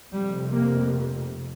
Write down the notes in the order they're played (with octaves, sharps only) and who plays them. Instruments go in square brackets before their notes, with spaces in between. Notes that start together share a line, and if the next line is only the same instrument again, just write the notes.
[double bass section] F1 F2 C3 G3
A#3